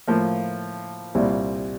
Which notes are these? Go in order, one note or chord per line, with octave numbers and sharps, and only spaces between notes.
A2 F3 A#3
C2 A#2 G3 C4 E4